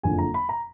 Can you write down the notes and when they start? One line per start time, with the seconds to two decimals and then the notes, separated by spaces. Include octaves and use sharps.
0.03 F#1 F2 D3 F3 G#5
0.18 A#5
0.34 B5
0.49 A#5